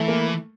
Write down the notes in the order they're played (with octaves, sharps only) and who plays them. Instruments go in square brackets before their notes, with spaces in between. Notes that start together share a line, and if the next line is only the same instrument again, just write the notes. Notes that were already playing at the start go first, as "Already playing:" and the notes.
Already playing: [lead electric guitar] E3 [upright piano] A3
[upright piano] A#3